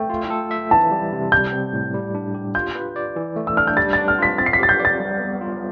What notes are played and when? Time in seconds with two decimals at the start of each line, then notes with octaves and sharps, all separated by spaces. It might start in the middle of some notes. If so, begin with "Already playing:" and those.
Already playing: A3 G5
0.10 F4
0.30 A4
0.51 E5
0.71 E3 A5
0.91 G3
1.12 C3
1.32 G3 G6
1.52 C4
1.73 A2
1.94 G3
2.15 D4
2.34 G4
2.55 F4 G6
2.75 B4
2.96 D5
3.16 E3
3.36 A3
3.47 E6
3.57 D4 F6
3.67 G6
3.77 G3 A6
3.93 D4 A6
4.08 F6
4.18 F4 B6
4.38 C4 A6
4.46 C7
4.53 B6
4.59 G4 A6
4.69 G6
4.80 D5
4.85 A6
5.00 G3
5.20 B3
5.41 F4